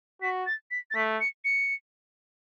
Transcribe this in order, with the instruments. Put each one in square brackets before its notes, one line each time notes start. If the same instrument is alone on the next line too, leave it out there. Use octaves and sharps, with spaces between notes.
[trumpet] F#4 [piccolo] B6
[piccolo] A6
B6
A6
[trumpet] A3 [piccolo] B6
[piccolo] C#7
C#7